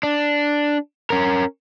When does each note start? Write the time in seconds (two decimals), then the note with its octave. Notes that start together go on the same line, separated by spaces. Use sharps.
0.03 D4
1.10 C#4 A#4